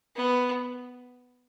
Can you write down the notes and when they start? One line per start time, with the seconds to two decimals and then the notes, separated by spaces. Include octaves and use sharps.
0.16 B3